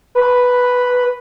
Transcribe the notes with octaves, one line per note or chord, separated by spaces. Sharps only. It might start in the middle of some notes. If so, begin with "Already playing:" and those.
B4